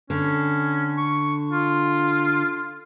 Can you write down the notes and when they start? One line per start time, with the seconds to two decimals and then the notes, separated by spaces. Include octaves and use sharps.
0.10 D3 C#4
0.97 C#6
1.51 F4